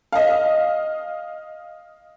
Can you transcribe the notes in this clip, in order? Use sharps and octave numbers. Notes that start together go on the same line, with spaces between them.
D#5 F5